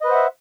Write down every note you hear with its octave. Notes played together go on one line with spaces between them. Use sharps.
B4 C5 D#5 E5 F#5